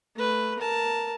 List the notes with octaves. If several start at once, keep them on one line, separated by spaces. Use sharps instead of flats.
A3 B4
A#4 A5